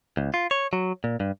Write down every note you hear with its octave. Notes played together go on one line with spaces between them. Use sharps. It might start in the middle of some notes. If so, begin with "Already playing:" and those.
C#2
F4
C#5
F#3
A#2
G2